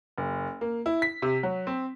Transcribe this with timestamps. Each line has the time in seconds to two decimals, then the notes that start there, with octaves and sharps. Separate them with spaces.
0.18 F#1
0.61 A#3
0.86 E4
1.02 B6
1.22 C3
1.43 F#3
1.67 C4